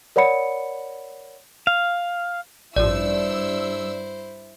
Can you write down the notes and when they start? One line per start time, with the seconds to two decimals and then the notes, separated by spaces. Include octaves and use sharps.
0.16 A#4 C#5 D5 F#5 B5 C#7
1.67 F5
2.76 A1 G2 F3 E4 C5 D5 E6